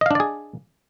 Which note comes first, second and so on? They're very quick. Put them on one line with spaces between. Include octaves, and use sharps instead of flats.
D#5 F5 D4 D5 G#4